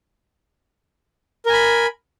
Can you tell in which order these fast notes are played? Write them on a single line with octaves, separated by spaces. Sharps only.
A#4 G#5 B5